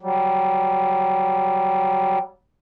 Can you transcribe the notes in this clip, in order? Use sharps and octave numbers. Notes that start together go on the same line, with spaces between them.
F#3 G3